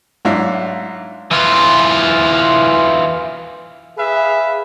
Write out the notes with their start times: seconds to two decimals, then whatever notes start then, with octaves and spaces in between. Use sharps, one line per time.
0.25 G#2 F#3 D4 E4 F5
1.31 E3 F4
3.98 G#4 B4 E5 F5